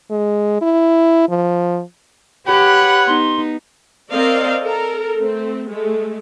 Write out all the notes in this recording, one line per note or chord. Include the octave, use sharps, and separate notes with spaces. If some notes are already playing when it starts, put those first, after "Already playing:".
G#3
E4
F3
G4 B4 C#5 F#5 B5
B3 D#4 C6
C4 A#4 D5 D#5 F5
A4 A#4
A3 C4
G#3 A3